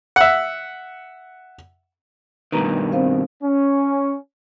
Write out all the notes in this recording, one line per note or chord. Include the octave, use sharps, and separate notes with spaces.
E5 F#5
G2 B2 D#3 B4 A#5
C4 C5 F5
C#4